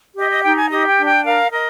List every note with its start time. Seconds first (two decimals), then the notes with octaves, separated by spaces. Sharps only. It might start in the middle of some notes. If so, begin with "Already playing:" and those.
0.17 G4 D#5
0.30 D#5
0.43 D#4 G5
0.57 G#5
0.71 G4 D#5
0.88 G5
0.98 D4
1.06 G5
1.24 A#4 F5
1.51 A#4 D#5